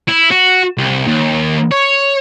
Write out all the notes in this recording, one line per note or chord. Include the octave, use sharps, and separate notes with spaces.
E4
F#4
C2
D#2
C#5